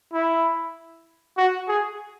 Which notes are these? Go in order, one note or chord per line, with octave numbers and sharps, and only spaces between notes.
E4
F#4
G#4